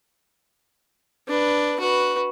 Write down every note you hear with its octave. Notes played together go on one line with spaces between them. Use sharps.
D4 B4
F#4 B4